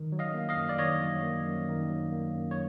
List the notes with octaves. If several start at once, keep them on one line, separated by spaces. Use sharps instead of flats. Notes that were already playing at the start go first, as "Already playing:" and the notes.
Already playing: D#3
F#3
D#5 F5
A#3
D#5 F5
F#2
D5
D#3 C#5 D#5
F#3
A#3
F#2
D#3
F#3
A#3
F#2
C#5